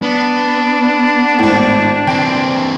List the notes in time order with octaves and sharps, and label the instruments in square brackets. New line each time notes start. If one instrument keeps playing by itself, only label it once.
[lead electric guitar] B3 [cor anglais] D4
[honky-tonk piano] G#1 A2
[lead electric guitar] E3 C4 [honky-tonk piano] G5